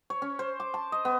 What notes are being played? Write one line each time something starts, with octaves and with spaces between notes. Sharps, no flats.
C#5
C#4
C5
D6
A5
D#5
B3